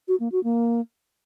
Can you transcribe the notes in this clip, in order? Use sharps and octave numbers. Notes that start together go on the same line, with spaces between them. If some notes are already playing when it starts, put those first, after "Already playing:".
F#4
A#3
F#4
A#3